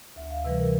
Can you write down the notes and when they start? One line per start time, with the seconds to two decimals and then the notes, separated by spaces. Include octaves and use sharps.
0.16 D2 E5
0.31 F5
0.45 C3 E3 G3 B4
0.58 A#4